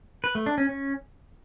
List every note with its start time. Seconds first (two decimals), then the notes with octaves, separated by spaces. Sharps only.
0.24 B4
0.35 A3
0.46 D4
0.58 C#4
0.69 C#4